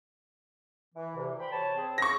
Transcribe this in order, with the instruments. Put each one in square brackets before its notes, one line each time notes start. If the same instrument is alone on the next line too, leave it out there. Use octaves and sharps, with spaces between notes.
[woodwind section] E3
D2 C3 E3
C5 G5 B5
C#5 A5
C4 G#4
[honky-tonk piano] C#6 A#6